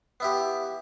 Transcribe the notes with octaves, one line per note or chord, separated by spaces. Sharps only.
B3 E4 G4